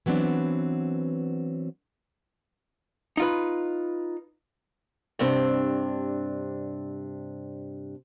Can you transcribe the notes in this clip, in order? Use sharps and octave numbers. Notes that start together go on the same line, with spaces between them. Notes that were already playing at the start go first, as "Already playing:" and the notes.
E3 F#3 B3 C4 D4
D#4 F4 B4
G2 C3 C4 D4